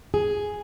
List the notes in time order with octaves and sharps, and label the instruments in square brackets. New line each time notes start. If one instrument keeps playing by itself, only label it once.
[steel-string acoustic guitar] G#4